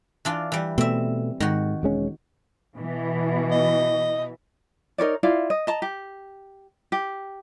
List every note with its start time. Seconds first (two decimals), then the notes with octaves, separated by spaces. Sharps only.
0.25 E3 D4 F4
0.52 E3 G3
0.78 B2 A3 C4 E5
1.40 G#2 D#3 F#4
1.83 E1 G#3 C#4
2.74 B2 E3
3.51 D#5
4.98 D#4 A#4 C#5 D5
5.23 E4 F4 D5 F5
5.50 D#5
5.67 D#5 A5 A#5
5.82 G4
6.92 G4